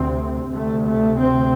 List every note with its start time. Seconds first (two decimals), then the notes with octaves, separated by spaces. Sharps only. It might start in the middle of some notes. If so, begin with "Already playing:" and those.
Already playing: D2 C3 C4
0.52 D2 C3 A3
0.87 A3
1.21 C4